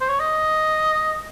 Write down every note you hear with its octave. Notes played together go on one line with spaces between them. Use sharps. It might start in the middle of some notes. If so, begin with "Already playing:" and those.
C5
C#5
D#5